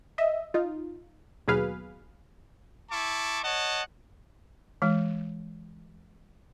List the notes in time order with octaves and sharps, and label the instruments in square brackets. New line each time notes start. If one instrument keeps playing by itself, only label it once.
[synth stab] D#5 E5
D#4 F4
D#2 B2 F#3 G#4 B4 F5
[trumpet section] E4 A5 C#6 D6
C#5 D#5 F#5 A5
[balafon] E3 G#3